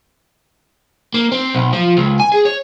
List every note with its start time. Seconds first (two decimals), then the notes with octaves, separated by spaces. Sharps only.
1.14 A#3
1.32 C4
1.55 B1
1.73 F3
1.97 C#2
2.20 G#5
2.32 G#4
2.45 C#5